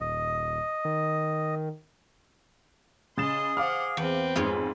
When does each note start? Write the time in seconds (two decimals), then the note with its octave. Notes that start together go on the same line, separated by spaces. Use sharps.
0.01 D#1 D#5
0.85 D#3
3.17 C#3 G#4 D#5 C6 A6 E7
3.57 C5 F5 F#5 D6 F6
3.97 E2 C4 B4 G5
4.36 F2 G#2 F4 G#4 C#5